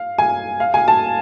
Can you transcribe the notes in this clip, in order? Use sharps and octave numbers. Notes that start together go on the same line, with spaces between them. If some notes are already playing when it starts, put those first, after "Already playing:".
Already playing: F5
G#5
F5
G#5
A5